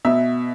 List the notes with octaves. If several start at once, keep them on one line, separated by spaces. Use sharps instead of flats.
B2 E5